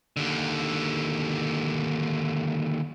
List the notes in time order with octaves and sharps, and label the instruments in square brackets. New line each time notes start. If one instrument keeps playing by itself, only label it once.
[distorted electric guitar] D#2 D3